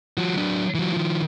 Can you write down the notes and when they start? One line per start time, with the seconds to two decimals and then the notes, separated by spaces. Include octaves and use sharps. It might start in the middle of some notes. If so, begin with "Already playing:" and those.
0.17 F3 F#4
0.36 F#3 D4
0.74 E3 F#3
0.94 D#3 F3